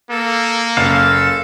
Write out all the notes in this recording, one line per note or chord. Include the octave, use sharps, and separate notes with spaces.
A#3 A4
F#1 A4 F5